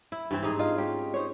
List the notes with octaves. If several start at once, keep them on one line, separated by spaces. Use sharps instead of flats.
E4
G2 E3 C4
G#2 D#4 G#4
F4 D#5
C#4 G4
D#4 C5 C#5